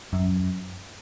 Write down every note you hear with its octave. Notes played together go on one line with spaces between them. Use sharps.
F#2